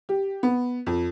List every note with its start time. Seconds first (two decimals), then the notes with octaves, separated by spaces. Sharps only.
0.09 G4
0.43 B3
0.87 F2